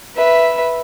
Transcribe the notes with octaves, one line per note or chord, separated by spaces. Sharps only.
B4 E5